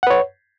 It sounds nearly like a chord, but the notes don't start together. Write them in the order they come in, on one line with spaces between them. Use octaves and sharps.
F#5 B4 C#5